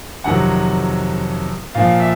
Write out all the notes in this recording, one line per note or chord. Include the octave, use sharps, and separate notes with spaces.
F2 C3 D#3 F#3 F#5
A#2 F3 F5
E5